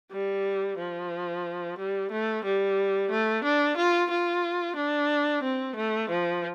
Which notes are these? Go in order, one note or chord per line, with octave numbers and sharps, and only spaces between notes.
G3
F3
G3
A3
G3
A3
D4
F4
F4
D4
C4
A3
F3